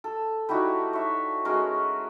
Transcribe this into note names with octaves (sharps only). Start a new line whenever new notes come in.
A4
G3 D#4 E4 F#4
C#5 E5
G#3 C#4 F#4 A#4